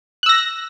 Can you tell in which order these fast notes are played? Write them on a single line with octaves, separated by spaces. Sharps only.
F#6 E6 A#6